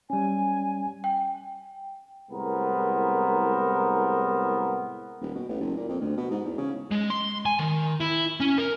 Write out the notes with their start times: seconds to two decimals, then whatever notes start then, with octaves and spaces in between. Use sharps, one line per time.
0.10 G3 C#4 G#5
1.04 G5
2.31 C2 A2 G#3 B3 A#4 C5
5.21 D#1
5.35 B2
5.49 A1
5.60 F#1
5.77 A#2
5.89 F2
6.00 D2
6.17 B2
6.31 G#2
6.45 E2
6.58 C#3
6.92 G#3
7.10 C6
7.46 G#5
7.59 D#3
8.01 E4
8.40 C#4
8.58 A#4